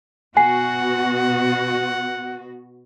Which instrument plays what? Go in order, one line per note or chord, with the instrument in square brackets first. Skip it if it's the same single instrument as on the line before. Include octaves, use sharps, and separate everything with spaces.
[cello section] B2 B3 F#4 [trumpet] F#5 [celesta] G#5 C7